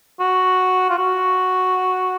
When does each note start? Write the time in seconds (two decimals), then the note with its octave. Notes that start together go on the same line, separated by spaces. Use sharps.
0.20 F#4
0.89 F4
0.98 F#4